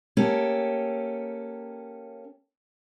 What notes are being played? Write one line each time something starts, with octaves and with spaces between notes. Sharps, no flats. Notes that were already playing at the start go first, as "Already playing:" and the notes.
A#3 C#4 G4 A4